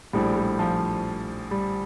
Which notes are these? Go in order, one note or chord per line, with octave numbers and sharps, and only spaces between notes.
A#1 A2 G3
G3
F3
G3